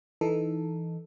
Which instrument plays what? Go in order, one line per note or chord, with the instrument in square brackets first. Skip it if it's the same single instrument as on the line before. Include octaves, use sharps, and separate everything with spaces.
[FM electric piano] E3 D#4 A4